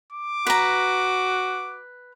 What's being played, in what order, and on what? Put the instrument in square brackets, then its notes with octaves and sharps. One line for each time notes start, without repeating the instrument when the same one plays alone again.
[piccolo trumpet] D6
[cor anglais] F#4 [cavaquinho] B4 A#5